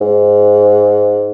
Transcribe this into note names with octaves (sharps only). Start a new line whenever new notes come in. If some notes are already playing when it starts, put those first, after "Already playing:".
G#2